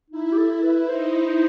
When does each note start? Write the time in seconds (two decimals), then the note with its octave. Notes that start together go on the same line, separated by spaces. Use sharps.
0.10 D#4 E4
0.32 G4
0.38 A4
0.63 B4
0.89 D#4 C5